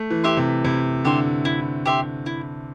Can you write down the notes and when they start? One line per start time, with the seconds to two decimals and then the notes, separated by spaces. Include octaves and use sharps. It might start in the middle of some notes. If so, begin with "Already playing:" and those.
Already playing: A3
0.10 E3
0.24 G4 E5 C6
0.37 C3
0.64 C3 E4
1.05 D3 G4 E5 C6
1.45 E4
1.86 G4 E5 C6
2.26 E4